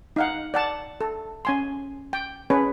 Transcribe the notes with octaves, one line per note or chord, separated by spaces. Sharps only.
D#4 F5 F#5
D5 F#5 A5
A4
C#4 G#5 C6
G5
C#4 G#4 B4 C#5